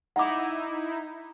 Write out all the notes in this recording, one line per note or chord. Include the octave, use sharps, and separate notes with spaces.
D#4 E4 F#5 D6